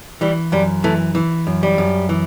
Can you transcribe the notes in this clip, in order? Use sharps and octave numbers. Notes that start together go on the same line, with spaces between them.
E3 G3
F#2 G3
E3 A3
E3
F#2
G3
F#2
E3